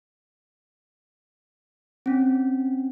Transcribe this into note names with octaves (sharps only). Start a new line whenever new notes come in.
C4 C#4